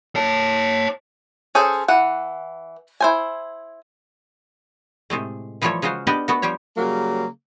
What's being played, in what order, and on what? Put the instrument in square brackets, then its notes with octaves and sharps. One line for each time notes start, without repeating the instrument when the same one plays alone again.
[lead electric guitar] C#5 A5
[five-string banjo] C#4 G#4 A4 C5
E3 F#5
E4 C5 G#5
[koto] A2 C3 G#3 A3
E3 F3 G3 A3 A4 C#5
C#3 G#3 F4 F#4 C5
B3 D4 G4 D5 D#5
A3 B3 F#4
F3 G3 G4 C#5
[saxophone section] C#3 F#3 G3 A#3